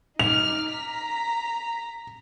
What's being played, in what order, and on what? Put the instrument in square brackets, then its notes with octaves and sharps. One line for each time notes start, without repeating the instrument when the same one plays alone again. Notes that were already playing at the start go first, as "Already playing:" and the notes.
[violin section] D#4 D6 F6 [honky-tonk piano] F7
[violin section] A#5 B6